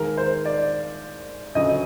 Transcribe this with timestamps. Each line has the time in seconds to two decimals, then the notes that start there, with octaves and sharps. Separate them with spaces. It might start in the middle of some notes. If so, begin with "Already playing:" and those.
Already playing: D#2 D#3 G#3 A#4
0.17 C5
0.45 D5
1.55 D2 C#3 F#3 D#5